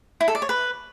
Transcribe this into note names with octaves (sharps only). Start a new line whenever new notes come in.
E4
A4
D5
C#5
B4